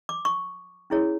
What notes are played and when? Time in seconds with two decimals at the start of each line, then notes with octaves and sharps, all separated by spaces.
0.09 D6
0.25 C#6
0.90 C#4 E4 G#4 C#5